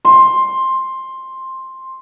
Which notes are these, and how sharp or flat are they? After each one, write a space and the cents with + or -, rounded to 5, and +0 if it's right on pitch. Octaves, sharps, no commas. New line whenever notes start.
C6 +10